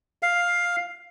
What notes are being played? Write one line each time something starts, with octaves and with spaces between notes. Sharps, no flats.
F5